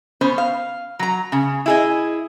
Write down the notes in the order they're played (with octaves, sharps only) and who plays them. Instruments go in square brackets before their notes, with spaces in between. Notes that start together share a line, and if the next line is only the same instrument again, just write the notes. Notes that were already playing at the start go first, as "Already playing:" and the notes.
[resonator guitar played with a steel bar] B3 C#4 C5
F5
F#3 A#5
C#3
E4 G#4 D#5